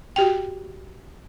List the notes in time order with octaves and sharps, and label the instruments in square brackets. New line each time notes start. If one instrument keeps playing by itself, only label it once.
[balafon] F#4 G4 G5